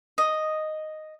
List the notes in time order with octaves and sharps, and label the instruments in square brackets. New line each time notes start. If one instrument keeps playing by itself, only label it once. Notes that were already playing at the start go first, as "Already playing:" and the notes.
[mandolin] D#5